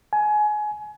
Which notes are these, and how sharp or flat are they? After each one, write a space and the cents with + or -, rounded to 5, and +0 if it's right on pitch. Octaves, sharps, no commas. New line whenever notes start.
G#5 +25